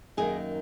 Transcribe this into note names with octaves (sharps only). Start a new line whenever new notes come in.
F#2 D#3 A#3 G#4